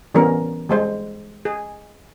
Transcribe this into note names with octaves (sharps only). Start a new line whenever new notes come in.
E3 G3 B3 C#4 A#4
G3 G#3 C5
G#4